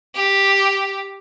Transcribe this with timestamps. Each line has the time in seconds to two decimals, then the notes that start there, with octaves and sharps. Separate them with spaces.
0.15 G4